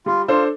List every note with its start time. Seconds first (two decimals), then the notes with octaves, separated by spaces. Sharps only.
0.06 G3 F4
0.28 D4 F4 A4 C5